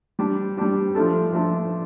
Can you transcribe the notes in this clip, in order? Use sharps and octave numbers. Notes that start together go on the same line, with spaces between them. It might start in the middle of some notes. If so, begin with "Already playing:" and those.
G3 D4 G4
G3 D4 G4
F3 A3 D4 A4
F3 A3 D4 A4